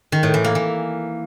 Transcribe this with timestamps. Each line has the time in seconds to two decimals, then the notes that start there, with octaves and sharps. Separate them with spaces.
0.12 D#3
0.23 A2
0.34 E3
0.44 A#3
0.55 E3